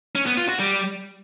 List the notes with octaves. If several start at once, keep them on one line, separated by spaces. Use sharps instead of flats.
C#4
B3
F4
F#4
G3